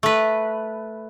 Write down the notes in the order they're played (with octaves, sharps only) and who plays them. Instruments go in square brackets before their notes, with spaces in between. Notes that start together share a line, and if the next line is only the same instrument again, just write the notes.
[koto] A3 B4